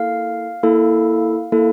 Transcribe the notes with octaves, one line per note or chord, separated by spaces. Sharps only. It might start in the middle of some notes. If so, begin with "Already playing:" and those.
Already playing: A#3 E4 A4 F5
A#3 E4 A4
A#3 E4 A4